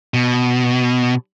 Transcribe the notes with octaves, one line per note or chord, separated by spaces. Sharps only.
B2